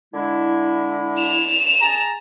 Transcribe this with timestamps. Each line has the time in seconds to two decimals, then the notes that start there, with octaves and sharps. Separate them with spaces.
0.13 D3 G#3 E4
1.17 E7 F7
1.81 G#4 A5 A#5